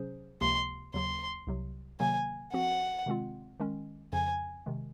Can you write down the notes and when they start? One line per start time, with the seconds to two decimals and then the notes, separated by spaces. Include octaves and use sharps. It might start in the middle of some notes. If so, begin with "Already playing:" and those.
Already playing: C3 F#3 C#4 G#4 C5
0.41 C#2 C3 F3 A#3 C6
0.94 D#2 C#3 F#3 A#3 C6
1.47 C2 C3 F#3
2.00 C3 D#3 F#3 A#3 G#5
2.53 F3 C4 F#4 F#5
3.06 C3 D#3 G#3 C4 F4
3.60 D#3 G#3 C#4
4.13 F2 C#3 F3 G#5
4.66 C3 D#3 G#3